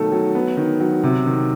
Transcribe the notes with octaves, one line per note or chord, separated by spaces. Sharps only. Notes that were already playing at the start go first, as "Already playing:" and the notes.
Already playing: B2 D#3 F#3 A3 A4
F#3
B3
D#3
F#3
C3
D#3